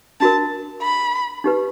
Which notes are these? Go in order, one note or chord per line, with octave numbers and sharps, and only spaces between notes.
D4 F#4 A#4 A5
B5
D#4 G4 B4